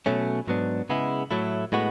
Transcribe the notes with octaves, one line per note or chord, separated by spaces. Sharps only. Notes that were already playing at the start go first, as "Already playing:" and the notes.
B2 F#3 A3 C#4
G#2 F#3 B3 D4
C#3 G#3 B3 E4
A2 F#3 A3 E4
A2 G#3 B3 F#4